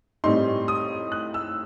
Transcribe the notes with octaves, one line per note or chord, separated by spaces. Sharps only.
A2 G3 C4 D#4 C6
D#6
F#6
E6